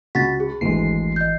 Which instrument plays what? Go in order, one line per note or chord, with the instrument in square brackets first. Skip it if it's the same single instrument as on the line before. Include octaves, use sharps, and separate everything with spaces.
[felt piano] C#2 [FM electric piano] F#4 [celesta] A6 B6
[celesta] G#4
[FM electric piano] G#1 E3 C7 [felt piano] D2 G#3
[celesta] D#5 G6